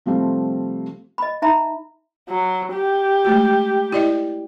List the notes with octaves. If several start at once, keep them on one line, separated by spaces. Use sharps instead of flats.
C3 F3 G3 A3 C4
D#5 B5
D#4 E5 A#5 B5
F#3
G4
G#3 A3 F#4
E4 D5 D#5